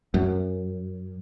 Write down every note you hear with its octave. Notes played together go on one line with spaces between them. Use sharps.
F#2